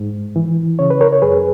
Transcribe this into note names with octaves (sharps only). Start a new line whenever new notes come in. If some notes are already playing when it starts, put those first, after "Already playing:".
Already playing: G#2
E3
C#3 C#5
B4
A#4 C#5
C#5
F#2 G#4 B4